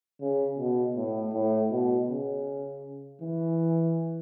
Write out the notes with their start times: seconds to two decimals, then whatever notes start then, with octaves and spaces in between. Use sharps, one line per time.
0.21 C#3
0.58 B2
0.95 A2
1.34 A2
1.71 B2
2.08 C#3
3.21 E3